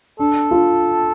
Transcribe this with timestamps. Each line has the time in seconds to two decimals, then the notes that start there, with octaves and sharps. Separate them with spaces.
0.19 D4 A4
0.51 F4